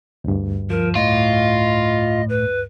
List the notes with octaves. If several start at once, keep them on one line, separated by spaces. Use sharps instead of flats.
D2 G2
F3 A#4
A2 F4 D#5
B4